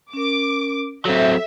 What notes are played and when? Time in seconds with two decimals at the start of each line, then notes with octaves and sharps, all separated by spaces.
0.13 C#4 A#4 D6
1.05 F#3 C4 A4 E5